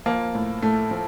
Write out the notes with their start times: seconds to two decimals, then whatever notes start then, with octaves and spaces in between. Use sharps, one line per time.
0.06 F3 A#3
0.34 A2
0.62 A2 A3
0.91 F3